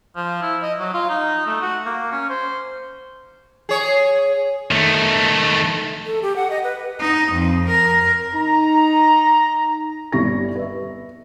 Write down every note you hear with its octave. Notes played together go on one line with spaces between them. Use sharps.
F3
E4
D#5
F#3
F4
D#4
A3
F#4
A#3
C#4
C5
G#4 C#5
D#3 A3
A4
G4
F#5
D#5
B4
D#4
F2
A#4
D#4 A#5
G1 G3 E4 D5 C#6 A#6
B4 E5